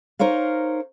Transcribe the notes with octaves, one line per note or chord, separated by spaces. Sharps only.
D#4 A#4 C5 C#5 F5